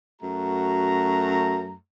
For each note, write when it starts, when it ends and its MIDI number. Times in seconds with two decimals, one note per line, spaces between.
0.22 1.74 42
0.22 1.74 57
0.22 1.74 66
0.22 1.74 82